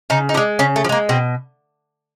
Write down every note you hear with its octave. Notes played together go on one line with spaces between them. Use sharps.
C#3 D#4
D#4
F3 D4
G#3
C#3 C#4
A3
F3
G#3 A#3
B2 C4